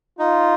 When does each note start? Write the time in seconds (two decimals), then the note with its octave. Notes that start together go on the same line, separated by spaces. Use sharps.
0.19 D#4 F4